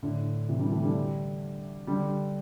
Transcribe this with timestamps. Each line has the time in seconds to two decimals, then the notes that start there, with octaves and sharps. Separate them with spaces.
0.02 A2 D3
0.49 C3 E3
0.60 D3 G3
0.72 E3 A3
0.83 D3 G3
1.87 D3 G3